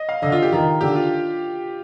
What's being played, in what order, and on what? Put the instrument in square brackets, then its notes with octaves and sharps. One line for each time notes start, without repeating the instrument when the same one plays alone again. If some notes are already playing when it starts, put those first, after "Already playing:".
Already playing: [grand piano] D#5
F5
[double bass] D3 [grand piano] D#5
[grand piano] F4
G4
[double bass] D#3 [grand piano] F4
[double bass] D3 [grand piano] G4
[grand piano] F4